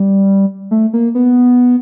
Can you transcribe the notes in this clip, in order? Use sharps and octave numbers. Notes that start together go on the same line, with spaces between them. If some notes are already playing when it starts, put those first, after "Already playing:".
Already playing: G3
A3
A#3
B3